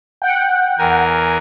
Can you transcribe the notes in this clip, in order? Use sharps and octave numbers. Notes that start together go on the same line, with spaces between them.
F#5 G5
E2 A#4 G#5